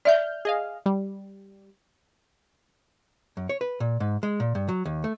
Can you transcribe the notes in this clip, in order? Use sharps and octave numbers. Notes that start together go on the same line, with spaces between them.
D5 E5 F6 G6
G#4 D#5 F5
G3
F#2
C#5
B4
A#2
G#2
G#3
A#2
G2
F#3
D#2
A3